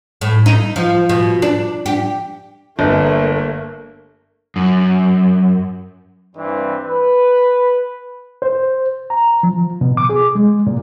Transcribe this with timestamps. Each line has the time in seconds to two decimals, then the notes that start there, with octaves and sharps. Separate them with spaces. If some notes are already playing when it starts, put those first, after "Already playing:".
0.21 A2
0.46 D#4
0.76 F3
1.09 B2
1.42 D4
1.86 G4
2.79 G1 A3 A#3
4.56 F#2
6.36 G2 E3 G3 C4
6.84 B4
8.42 C5
9.10 A#5
9.43 F3
9.81 B2
9.97 D6
10.10 G#4
10.35 G#3
10.67 A#2